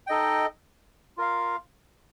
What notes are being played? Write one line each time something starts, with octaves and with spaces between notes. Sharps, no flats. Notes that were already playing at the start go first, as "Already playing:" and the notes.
D#4 A4 D#5 G5
F4 A#4 F5